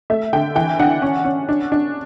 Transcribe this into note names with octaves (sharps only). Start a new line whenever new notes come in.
A3 E5
D3 G5
E3 G5
D4 F#5
C#4
C#4
D4
D4